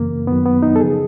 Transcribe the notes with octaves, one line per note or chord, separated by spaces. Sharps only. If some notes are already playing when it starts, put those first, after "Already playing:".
Already playing: F#2 C#3 E3 A#3
F#2 D#3 F#3 B3
B3
D#4
A4
C#3 F3 G#4